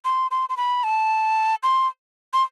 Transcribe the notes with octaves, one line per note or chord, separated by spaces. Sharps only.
C6
C6
C6
B5
A5
C6
C6